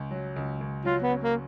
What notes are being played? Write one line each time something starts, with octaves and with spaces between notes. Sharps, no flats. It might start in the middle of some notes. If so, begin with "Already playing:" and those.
Already playing: C#2
F#3
C#2
C#2
F#3 F4
B3
C#4
A#3